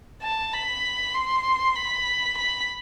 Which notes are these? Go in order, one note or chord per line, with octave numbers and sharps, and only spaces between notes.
A5
B5
C6
B5
B5